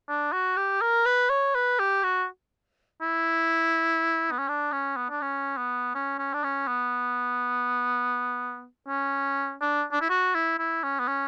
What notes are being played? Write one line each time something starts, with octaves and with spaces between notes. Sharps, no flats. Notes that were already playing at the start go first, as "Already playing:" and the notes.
D4
F#4
G4
A#4
B4
C#5
B4
G4
F#4
E4
B3
C#4
D4
C#4
B3
D4
C#4
B3
C#4
C#4
D4
C#4
B3
C#4
D4
D4
E4
F#4
E4
E4
C#4
B3
C#4